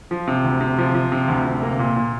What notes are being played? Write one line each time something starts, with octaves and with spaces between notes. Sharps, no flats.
F3
C3
D2
C3
F3
F3
C3
D2
C3
A#3
A#2
A#2